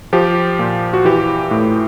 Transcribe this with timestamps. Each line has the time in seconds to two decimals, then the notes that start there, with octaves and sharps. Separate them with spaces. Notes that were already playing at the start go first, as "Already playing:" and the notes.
0.13 F3 G4
0.59 A#2
0.94 F#4
1.05 E3 G4
1.51 A2